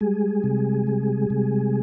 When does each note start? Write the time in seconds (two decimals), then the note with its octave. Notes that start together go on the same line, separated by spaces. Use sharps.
0.01 G3 G#3 G#4
0.44 C3
0.87 G3
1.30 C3